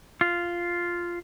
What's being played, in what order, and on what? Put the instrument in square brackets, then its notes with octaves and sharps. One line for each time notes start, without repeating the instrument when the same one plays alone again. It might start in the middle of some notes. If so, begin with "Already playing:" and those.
[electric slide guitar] F4